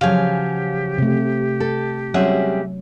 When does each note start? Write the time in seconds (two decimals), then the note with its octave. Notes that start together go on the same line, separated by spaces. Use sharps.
0.01 C#3 F3 F#3 G4 F5 G#5
0.98 C3 A3
1.60 A4
2.14 F#3 G3 C4 C#4 G#4 E5 F#5